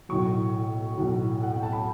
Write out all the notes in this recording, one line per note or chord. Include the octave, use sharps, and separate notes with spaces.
B1 A2 F#3 C#6
B1 A2 F#3
F#5
G5
A5
B5